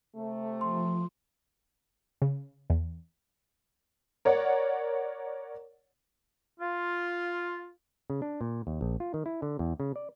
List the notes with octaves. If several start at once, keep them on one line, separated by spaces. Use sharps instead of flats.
C3 A3
F3 C6
C#3
E2
A#4 C#5 D5 F#5
F4
C#3
D4
A#2
D#2
A#1
F4
D#3
E4
D3
E2
C#3
D5